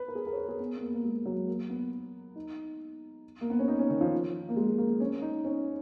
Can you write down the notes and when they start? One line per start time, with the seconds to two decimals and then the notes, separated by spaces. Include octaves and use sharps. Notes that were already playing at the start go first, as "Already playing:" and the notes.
Already playing: B4
0.08 A#4
0.15 G#4
0.26 A#4
0.32 C#5
0.37 B4
0.49 G#4
0.60 B3
0.77 B3
0.82 A#3
0.94 A#3
1.04 G#3
1.25 F#3
1.47 A#3
1.70 B3
2.36 D#4
3.41 A#3
3.50 B3
3.59 C#4
3.68 D#4
3.79 C#4
3.90 D#3
4.01 F3
4.49 A#3
4.56 G#3
4.78 A#3
5.00 C#4
5.22 D#4
5.45 C#4